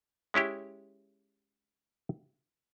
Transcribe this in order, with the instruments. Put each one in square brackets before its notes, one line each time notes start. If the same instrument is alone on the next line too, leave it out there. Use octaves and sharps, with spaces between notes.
[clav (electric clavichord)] G#3 C#4 E4 G4